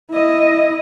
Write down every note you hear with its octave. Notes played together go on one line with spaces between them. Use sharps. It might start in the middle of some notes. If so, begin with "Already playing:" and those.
E4 D#5